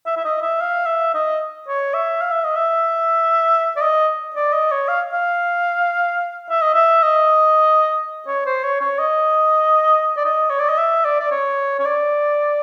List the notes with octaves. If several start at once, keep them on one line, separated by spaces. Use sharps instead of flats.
E5
E5
D#5
E5
F5
E5
D#5
C#5
E5
F5
E5
D#5
E5
D5
D#5
D5
D#5
C#5
F5
F5
E5
D#5
E5
D#5
C#5
C5
C#5
C#5
D#5
D5
D#5
C#5
D5
D#5
E5
D5
D5
C#5
C#5
D5